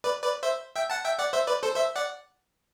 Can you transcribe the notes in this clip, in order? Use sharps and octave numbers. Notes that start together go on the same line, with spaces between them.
B4 D5
B4 D5
C5 E5
E5 G5
F#5 A5
E5 G5
D5 F#5
C5 E5
B4 D5
A4 C5
C5 E5
D5 F#5